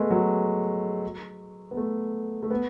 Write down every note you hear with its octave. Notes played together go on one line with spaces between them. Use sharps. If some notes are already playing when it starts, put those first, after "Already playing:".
Already playing: G#3 A3 B3
F#3
B3
A3
A3
B3